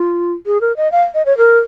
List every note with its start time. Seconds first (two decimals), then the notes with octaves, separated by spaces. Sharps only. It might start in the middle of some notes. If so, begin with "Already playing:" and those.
Already playing: F4
0.46 G#4
0.61 A#4
0.77 D#5
0.92 F5
1.15 D#5
1.26 C#5
1.38 A#4